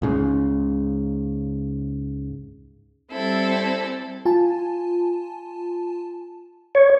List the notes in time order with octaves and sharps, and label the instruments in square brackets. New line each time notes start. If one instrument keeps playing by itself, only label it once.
[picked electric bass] C#2 G#2 C#3
[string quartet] G3 C4 E4 A4
[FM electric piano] F4 G#5 A5
[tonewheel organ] C#5